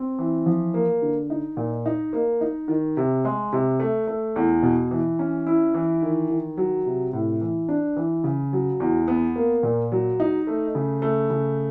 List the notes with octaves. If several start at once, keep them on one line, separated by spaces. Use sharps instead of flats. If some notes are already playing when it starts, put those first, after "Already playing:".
Already playing: C4
E3
F3
A#3
D3
D#4
A#2
D#4
A#3
D#4
D#3
C3
G#3
C3
A3
A3
E2
B2
E3
C#4
E4
E3
D#3
D#3
F#3
C3
A2
E3
D4
E3
C#3
F#3
E2
B3
A#3
A#2
F#3
D#4
A3
C#3
A3
C#3